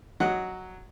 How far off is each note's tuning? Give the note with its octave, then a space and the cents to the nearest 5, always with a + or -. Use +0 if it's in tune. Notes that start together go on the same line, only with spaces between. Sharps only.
F#3 +0 D#5 +0 F#5 +0